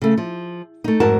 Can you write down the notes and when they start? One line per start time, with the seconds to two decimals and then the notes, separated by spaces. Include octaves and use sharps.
0.02 C#3 A3
0.17 F3
0.84 A3 D#4
1.00 F2 G#2 F#4 A#4 A5